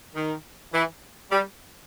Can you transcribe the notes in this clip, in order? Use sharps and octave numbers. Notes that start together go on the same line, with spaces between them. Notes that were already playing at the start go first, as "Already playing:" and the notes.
D#3
E3
G3